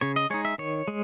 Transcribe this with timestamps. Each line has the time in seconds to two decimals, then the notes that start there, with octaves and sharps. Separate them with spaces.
0.01 C#3 C#5
0.16 D#5
0.30 G#3 D#4 C#5
0.45 E5
0.58 D#3 C#5
0.88 G#3